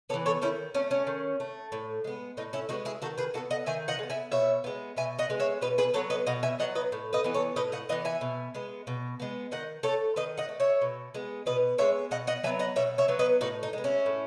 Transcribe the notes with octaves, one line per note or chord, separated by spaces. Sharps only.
E3 B3 A4 C#5
A4 C#5
D#3 C#4 E4
A3 C#4
C#4
D#3
A3
A2
G#3 B3
A2 D#4
C#4 E4
G#3 B3 D#4 F#4
E4 G#4
D#3 F#4 A4
G#4 B4
G#3 B3 F#4 A4
D#5 F#5
D#3 E5 G#5
D#5 F#5
G#3
B3
E5 G#5
B2 C#5 E5
G#3 B3
B2 E5 G#5
D#5 F#5
G#3 B3
C#5 E5
B2 B4 D#5
G#4 B4
F#3 B3 A4 C#5
B4 D#5
B2 D#5 F#5
E5 G#5
F#3 B3 D#5 F#5
B4 D#5
A2
B4 D#5
E3 B3
A4 C#5
A2 B4 D#5
D#5 F#5
E3 B3 D#5 F#5
E5 G#5
B2
G#3 B3
B2
G#3 B3
D#3 D#5 F#5
A3 A4 C#5
D#3 B4 D#5
D#5 F#5
A3
C#5 E5
B2
G#3 B3
B2 B4 D#5
G#3 B3 C#5 E5
B2 D#5 F#5
D#5 F#5
F#3 B3 E5 G#5
D#5 F#5
B2 C#5 E5
C#5 E5
F#3 B3
B4 D#5
A2 D#4 F#4
D#4
G#3 B3
C#4 E4
A2